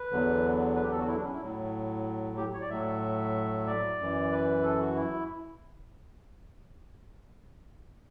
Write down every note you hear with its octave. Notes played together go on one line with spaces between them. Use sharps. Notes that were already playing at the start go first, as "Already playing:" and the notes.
Already playing: B4
E2 D3 F#3
B4
G4
A4
F#4
E4
D4
C#4
E4
A2 F#3
G4
C#5
D5
A2 F#3 E5
D5
F#2 E3
B4
A4
F#4
E4